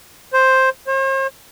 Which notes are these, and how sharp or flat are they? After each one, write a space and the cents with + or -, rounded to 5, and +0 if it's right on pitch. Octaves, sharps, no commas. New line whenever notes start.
C5 +5
C5 +45